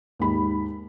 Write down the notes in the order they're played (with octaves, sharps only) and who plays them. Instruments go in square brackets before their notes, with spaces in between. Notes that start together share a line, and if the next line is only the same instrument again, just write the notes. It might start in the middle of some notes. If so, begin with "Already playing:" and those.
[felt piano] D#2 G#2 B5